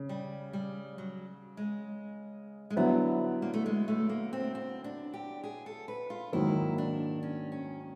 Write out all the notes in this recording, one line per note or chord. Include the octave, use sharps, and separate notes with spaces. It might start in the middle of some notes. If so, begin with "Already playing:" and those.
Already playing: C#3
G3
G3
F#3
G#3
G#3
D3 F#3 G3 B3 E4
A#3
A3
G#3
A3
A#3
C4
C4
D4
G4
G#4
A4
B4
F4
G#2 D#3 F#3 A#3 E4
D4
C#4
C#4